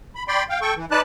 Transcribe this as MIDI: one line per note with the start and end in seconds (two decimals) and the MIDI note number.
0.15 0.23 83
0.28 0.43 74
0.28 0.43 79
0.28 0.43 83
0.28 0.43 84
0.49 0.59 77
0.49 0.59 79
0.61 0.74 69
0.61 0.74 79
0.61 0.74 85
0.76 0.85 52
0.91 1.01 63
0.91 1.01 71
0.91 1.01 74
0.91 1.01 81
0.91 1.01 90